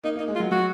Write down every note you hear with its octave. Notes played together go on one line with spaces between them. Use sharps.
A#3 D#4
A#3 D#4
G#3
F4
F#3
F#3 F#4